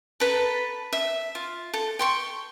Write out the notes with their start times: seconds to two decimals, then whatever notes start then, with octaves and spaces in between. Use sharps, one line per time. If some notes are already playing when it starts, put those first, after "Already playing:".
0.20 A4 B4 A5 A#5
0.93 E5
1.35 F4
1.74 A4
1.99 G5 C6 C#6